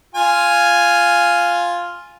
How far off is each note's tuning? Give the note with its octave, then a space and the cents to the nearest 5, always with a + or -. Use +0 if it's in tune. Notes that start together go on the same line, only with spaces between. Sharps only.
F4 +0 G#5 +0